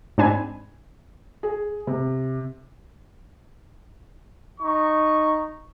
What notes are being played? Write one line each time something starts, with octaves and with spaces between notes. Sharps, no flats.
G#2 C4 D4 G#5 B5 G#6
G#4
C3
D#4 C#6